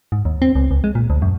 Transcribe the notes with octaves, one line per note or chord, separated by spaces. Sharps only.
G#2
D#2
C4
C#2
C#2
G#3
A#2
D2
F#2